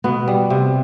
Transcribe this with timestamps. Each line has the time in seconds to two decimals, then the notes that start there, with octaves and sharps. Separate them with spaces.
0.04 B2 B3
0.28 G3
0.50 C3